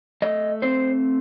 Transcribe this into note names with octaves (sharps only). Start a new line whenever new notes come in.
A3 D#5
C4 C5